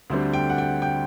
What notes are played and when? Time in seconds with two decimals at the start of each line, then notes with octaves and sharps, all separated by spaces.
0.10 D2 D3 G3 C4
0.33 G5
0.49 F#5
0.58 G5
0.82 G5